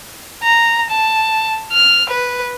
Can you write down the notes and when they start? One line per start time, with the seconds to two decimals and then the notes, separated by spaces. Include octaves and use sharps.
0.43 A#5
0.90 A5
1.72 F6
2.10 B4